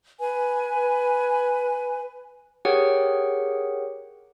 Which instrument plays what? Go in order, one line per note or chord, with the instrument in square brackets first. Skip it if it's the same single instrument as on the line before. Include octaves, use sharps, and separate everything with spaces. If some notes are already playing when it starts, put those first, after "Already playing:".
[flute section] B4 G#5
[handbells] G4 G#4 A#4 C#5 F#5 G5